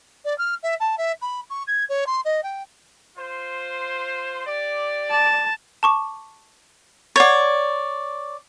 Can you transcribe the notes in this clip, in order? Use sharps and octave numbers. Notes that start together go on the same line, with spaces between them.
D5
F6
E5
A5
E5
B5
C#6
G#6
C#5
C6
D#5
G5
F4 C5
G4 D5
A5
A5 C#6 D6
C#5 D5 F#5 G#6 A6